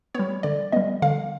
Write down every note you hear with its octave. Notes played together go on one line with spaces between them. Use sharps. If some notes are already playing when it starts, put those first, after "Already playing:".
G3 B3 C#5
D3 D5
G3 B3 D#5
D3 F5